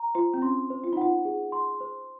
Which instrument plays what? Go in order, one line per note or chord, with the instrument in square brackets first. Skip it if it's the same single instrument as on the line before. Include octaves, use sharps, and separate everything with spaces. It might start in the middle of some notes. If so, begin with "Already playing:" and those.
Already playing: [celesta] A#5
[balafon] F4 [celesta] C5
[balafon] C4
[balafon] C#4 [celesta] C6
[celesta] C5
[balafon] F4
D#4
[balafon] F4 [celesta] F#5
[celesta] G#4
C6
C5